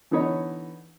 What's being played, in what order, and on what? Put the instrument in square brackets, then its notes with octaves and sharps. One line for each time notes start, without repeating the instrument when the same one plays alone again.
[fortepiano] D3 E3 B3 D#4 C#5